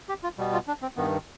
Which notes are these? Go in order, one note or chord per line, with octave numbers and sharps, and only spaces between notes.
G4
F4
B2 G3 B3
F4
D4
C4
G2 D#3 B3